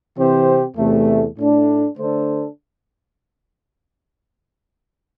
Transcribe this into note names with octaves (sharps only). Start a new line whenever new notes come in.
C3 E3 C4 G4 C5
E2 C3 A3
A2 A3 D4 A4
D3 A3 D4 A4 C5